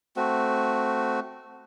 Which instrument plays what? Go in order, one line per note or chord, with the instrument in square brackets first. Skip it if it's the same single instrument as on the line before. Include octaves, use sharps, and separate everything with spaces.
[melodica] A3 C4 F#4